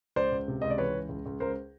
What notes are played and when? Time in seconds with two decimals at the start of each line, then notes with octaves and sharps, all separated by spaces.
0.16 C#2 C5 D5
0.32 C#2
0.48 C3
0.62 C#2 D#5
0.70 D5
0.78 E3 B4 C#5
0.94 C#2
1.09 C#2
1.26 C#2
1.40 C#2 A#4 C5